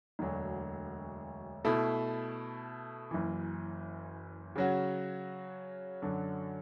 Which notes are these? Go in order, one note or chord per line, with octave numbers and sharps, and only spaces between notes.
E1 D2 D3 F#3
B2 A3 E4
F#1 F#2 E3
C#3 F#3 C#4 F#4
F#2 D3 F#3